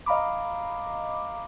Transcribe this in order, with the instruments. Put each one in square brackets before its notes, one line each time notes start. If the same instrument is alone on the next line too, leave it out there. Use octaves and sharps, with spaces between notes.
[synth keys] D#5 F5 A#5 B5 D6